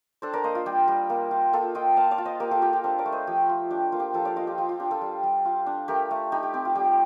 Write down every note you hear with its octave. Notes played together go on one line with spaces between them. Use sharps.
D4 A4 C5
A#4 D5
A#3 C5 D#5
F4
G3 G4
G3
A#3
F4
A#3 F4 A4
F4 D#5 G5
A#3 F5 A5
D5 F5
F4
C5 D#5
A#3 G4 A#4
F4 A4
F4 G4
G4
D4 A4 C5
A#4 D5
A3
C5 D#5
F3 G4
F4
D4 G4
A#3 F4
G4
F3 F4 A4
D5 F5
F4 C5 D#5
G4
F4 G4
F4
D4 G4
F4 A4
G3
G3
F4
D4
A3 G4 A#4
A3
D#4 G4
G4
C4 G4
F4
G3 G4